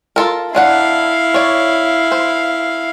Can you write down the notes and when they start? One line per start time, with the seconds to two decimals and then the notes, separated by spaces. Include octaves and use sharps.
0.16 F4 A4 A#4
0.55 D#3 D4 E4 F5 F#5
1.34 C#5 D5
2.12 C5